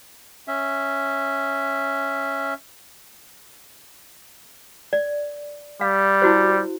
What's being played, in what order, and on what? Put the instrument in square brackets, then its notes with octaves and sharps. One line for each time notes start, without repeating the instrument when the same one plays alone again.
[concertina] C#4 E5
[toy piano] D5
[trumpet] G3 [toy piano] F5
[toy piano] E4 F#4 C5